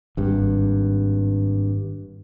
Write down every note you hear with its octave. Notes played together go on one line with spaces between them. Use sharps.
G#1 G2